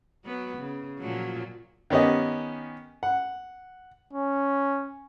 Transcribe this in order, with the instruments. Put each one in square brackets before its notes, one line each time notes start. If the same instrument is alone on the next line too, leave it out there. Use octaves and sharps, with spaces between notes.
[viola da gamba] F#3 B3
C#3
A#2 F3 F#3
[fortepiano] D#3 B3 C#4 G4 D#5
F#5
[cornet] C#4